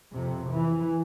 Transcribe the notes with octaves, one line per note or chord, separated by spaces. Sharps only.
F2 C3
E3